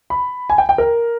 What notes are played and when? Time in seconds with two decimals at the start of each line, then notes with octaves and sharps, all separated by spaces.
0.10 B5
0.50 G#5
0.58 G5
0.69 G5
0.78 A#4